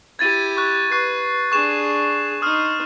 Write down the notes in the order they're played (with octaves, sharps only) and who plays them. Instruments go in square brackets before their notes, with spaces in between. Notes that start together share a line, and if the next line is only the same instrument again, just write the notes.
[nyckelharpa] E4 G4 [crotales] G#6 A6 D#7
[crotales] C#6 F#6
[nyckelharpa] B4 [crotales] C#6 F#6 C7
[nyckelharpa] D4 G#4 [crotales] C#6 E7
[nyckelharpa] D#4 C6 [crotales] D#6 F6